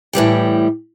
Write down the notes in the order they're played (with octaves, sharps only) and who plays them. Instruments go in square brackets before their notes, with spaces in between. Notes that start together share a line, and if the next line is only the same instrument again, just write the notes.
[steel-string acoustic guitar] A2 E3 G3 G5